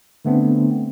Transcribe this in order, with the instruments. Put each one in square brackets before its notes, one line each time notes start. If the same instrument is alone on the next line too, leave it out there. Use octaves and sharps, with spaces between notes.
[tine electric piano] D3 A3 B3 C4 D4